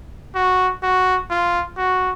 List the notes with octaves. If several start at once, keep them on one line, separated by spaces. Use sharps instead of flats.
F#4
F#4
F4
F#4